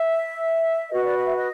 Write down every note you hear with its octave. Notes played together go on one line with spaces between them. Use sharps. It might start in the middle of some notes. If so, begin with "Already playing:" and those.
Already playing: E5
F#4 B4 D#5
D5
D#5
E5
D#5